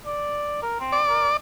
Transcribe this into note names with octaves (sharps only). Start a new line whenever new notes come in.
D5
A#4
C4
D5
A#4